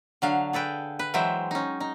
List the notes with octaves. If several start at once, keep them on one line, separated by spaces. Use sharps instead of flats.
D3 F#3 F5
G#4 A4 B4 G5
B4
E3 F#3 G#3 C5 E5 G5
C#4 D#4
D#4